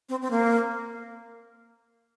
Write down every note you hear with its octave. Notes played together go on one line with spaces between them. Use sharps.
C4
C4
A#3